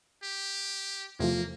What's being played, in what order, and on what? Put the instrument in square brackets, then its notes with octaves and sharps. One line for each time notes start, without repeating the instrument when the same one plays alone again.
[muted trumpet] G4
[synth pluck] E2 C3 [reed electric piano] F3 A3 F4 [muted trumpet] A#3